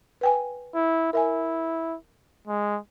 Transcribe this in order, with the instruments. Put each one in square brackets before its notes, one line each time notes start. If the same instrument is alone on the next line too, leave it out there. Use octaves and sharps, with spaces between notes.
[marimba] B4 G5 G#5
[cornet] E4
[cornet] E4 [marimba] A#4 E5 G#5
[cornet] G#3